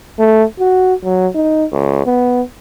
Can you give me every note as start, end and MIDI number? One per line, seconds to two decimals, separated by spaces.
0.19 0.43 57
0.60 0.94 66
1.04 1.27 54
1.35 1.65 63
1.72 2.06 37
2.06 2.41 59